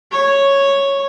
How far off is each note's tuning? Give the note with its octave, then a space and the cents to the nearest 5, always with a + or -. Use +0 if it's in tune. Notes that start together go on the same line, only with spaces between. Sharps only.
C#5 -5